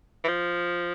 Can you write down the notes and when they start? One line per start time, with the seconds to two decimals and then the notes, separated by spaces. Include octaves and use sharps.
0.24 E3
0.28 F3